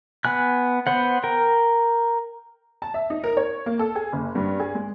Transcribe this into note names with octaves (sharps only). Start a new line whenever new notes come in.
B3 G#5 F#6
B3 C5 F#5
A#4 G5
A5
E5
D#4
A#4
C#5
A#3
A4
G#4
F#1
G2
G#4
G#3